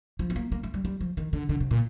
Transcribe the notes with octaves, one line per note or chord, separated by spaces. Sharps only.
F3
C4
A#3
A#3
A3
G3
G3
F3
D#3
D3
D3
C3
A#2